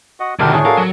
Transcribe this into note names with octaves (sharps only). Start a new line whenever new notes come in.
F#4 D#5 F#5
E1 D3 D#3 D4 F#4 G4 A#4
A2 D4 G#4 C#5
F#4 A4 A#4 F5
F#3